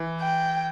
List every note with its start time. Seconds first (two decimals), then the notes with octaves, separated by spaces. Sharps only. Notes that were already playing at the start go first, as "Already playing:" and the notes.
Already playing: E3
0.21 G5